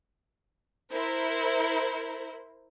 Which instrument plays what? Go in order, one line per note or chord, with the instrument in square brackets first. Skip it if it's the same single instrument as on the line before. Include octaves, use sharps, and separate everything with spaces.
[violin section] E4 A#4 C5